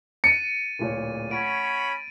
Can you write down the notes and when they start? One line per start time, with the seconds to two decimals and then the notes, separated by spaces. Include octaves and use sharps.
0.24 A6 C#7 D#7
0.79 D1 A#2 C#5
1.31 C#4 C#5 F#5 B5 D7